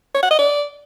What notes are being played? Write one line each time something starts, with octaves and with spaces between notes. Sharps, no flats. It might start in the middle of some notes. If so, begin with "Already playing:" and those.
C#5
F#5
D#5
D5